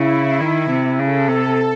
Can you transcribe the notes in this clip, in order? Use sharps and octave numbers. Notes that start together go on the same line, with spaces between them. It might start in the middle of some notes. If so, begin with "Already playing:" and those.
Already playing: C#3 E4
D#3
C3
C#3 A4
C3 A4